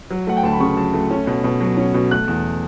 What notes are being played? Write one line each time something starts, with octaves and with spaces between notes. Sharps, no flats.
F#3
A3 F#5
G5
D2 A5
B5
C#3 C#6
F#3 A5
A3
C#4
B2
B2
F#3
C#4
B2
A3 F#6
E2